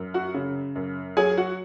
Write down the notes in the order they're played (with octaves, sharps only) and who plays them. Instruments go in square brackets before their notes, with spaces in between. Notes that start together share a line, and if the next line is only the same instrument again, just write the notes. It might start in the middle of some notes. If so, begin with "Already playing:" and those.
Already playing: [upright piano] F#2
F#4 F#5
C#3
F#2
F#3 G#4 G#5
F#4 F#5